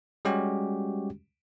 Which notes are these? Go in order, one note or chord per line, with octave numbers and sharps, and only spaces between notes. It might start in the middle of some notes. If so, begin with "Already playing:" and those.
G3 G#3 C#4 F#4 G4